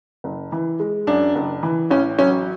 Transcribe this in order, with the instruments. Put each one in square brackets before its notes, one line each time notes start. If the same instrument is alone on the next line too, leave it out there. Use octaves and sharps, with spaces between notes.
[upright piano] F#1
E3
G#3
F#2 D4
F#1
E3
A1 C#4
F#3 C#4